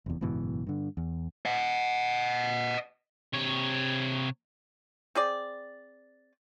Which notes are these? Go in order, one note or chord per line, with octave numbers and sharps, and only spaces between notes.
F1 E2
F#1 G#2 B2 E3
G2 D3
E2
D#5 F#5
C3 C#5
C4 G#4 D5